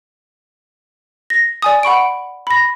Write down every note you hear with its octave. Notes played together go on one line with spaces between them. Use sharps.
A#6
D5 G#5 D#6
F#5 B5 C#6 D7
B5 A#6